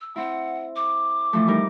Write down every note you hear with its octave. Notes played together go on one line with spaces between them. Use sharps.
E6
C4 E4 F#5
D6
E3 F3 A3
G3 D#4 A#4